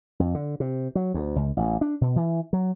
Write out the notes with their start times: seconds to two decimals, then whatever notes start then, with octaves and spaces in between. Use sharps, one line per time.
0.20 F2
0.34 D3
0.60 C3
0.95 F#3
1.14 D2
1.36 C#2
1.57 A1
1.81 D4
2.01 B2
2.16 E3
2.53 F#3